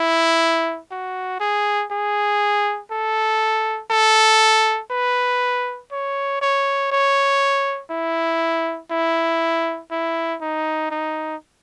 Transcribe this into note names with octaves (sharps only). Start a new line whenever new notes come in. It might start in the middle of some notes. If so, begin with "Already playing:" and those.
Already playing: E4
F#4
G#4
G#4
A4
A4
B4
C#5
C#5
C#5
E4
E4
E4
D#4
D#4